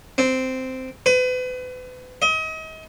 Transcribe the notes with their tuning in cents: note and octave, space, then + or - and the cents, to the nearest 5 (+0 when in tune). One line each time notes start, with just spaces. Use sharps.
C4 -10
B4 +35
D#5 +35